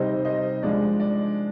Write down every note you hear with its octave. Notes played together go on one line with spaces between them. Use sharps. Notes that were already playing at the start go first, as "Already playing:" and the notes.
Already playing: C3 G3 C4 D#4 C5 D#5
C5 D#5
F3 G#3 D4 D5
D5